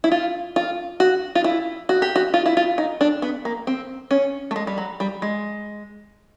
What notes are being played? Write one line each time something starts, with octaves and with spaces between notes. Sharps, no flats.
E4
F4
F4
F#4
F4
E4
F#4
G4
F#4
F4
E4
F4
D#4
D4
B3
A#3
C4
C#4
A3
G#3
G3
F#3
G3
G#3